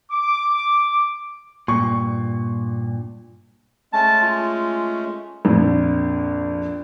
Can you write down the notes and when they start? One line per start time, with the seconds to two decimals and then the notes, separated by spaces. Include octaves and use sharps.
0.11 D6
1.68 G2 A#2 C#6
3.93 G#3 A3 C#4 A5
4.22 F4
5.45 A#1 F2